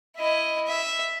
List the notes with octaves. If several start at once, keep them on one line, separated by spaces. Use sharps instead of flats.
E4 D#5
E5